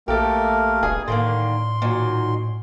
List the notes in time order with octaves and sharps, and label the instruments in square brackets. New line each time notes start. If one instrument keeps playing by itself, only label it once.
[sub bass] A#1 [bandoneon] A3 A#3 A#4 [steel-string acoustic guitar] G4 A4
[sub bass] D#1 [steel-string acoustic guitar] G2 G#4 G#5
[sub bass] A2 [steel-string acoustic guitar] D3 D#3 A#3 [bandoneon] C6
[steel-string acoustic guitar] A#2 D#3 F#3